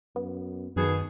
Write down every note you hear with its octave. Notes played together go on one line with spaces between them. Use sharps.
F#2 B3
F#2 B2 D#3 G#4